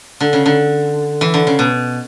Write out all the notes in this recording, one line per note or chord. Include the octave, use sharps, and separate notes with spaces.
D3
C#3
D3
E3
D3
C#3
B2